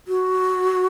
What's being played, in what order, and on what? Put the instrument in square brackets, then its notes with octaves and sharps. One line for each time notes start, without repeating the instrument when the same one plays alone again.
[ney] F#4